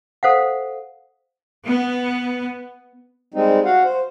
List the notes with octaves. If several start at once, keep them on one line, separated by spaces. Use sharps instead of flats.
A4 C5 F5 F#5
B3
G3 G#3 C4 D#4
F#4 F5 F#5
C5